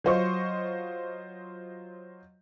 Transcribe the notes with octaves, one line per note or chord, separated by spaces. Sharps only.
F#3 F4 C5 D#5 C#6